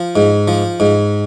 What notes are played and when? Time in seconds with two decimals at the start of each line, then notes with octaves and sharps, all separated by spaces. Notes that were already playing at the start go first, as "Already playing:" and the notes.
Already playing: F3
0.16 G#2
0.48 F3
0.80 G#2